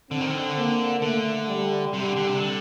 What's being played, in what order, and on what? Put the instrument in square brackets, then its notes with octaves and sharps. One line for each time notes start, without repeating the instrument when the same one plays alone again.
[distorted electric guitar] D3 [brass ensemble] C4
[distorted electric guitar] D#3
D3
[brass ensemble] A#3
[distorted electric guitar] D3 [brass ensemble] A3
[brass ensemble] G3
[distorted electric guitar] C3 [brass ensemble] G3
[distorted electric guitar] D3
D3
C3
D3